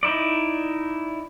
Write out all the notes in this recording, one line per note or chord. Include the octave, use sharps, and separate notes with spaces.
D#4 E4 D5